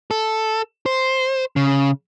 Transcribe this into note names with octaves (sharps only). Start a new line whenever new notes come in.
A4
C5
C#3